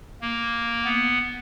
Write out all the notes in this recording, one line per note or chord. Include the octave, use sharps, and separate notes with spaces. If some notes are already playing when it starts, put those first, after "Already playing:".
A#3
B3